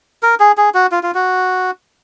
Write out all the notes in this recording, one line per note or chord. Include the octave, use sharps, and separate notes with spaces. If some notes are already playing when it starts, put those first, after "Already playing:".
A#4
G#4
G#4
F#4
F4
F4
F#4